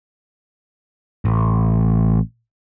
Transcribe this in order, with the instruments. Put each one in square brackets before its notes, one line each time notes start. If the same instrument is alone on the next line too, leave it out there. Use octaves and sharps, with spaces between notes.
[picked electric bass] A1